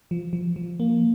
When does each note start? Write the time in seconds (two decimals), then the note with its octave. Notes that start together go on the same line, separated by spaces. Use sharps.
0.11 F3
0.33 F3
0.56 F3
0.80 A#3